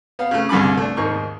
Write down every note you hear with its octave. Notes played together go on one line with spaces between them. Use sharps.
B3 F5
C#3 A3
C2 G2 D3 G#4 B5 D6
A3 D4
D#2 G#2 D#3 C#6